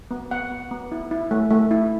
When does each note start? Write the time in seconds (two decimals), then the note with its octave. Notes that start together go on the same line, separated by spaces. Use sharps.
0.11 B3
0.31 B3 F#5
0.51 B3
0.71 B3
0.92 E4
1.11 E4
1.31 A3
1.50 A3
1.71 E4